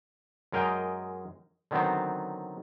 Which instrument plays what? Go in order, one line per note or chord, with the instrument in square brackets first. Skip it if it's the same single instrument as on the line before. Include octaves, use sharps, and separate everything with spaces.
[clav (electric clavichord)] F#2 G#3 A#4 D#5 G5
D3 D#3 F#3 B3 C4